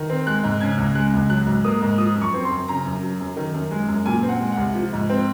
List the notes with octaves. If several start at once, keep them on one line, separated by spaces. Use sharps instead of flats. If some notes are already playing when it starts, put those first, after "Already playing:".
Already playing: D#3
C4
G#3 F#6
G#2
C#3 G#6
C#2
G#3 F#6
C#2
F#3 F#6
G#2
A#3 D#6
G#2
F3 D#6
F#2
C#6
C4
C6
F#2
C#3 A#5
F#2
F#3
F#2
D#3
F#2
G#3
F#2
A#2 G#5
C4
F#5
G#3
C2 F#5
F3
G#2
C4